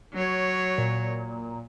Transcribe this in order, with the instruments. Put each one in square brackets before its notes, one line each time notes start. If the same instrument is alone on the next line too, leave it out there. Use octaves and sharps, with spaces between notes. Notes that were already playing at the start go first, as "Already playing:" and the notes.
[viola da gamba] F#3 C#5
[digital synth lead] A#2